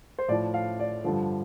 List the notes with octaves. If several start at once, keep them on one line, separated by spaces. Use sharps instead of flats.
C5
A2 F3 D5
F5
D5
G2 D3 F3